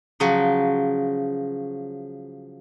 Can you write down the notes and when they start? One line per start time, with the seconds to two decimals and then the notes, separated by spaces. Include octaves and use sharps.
0.20 C#3 F3 F#3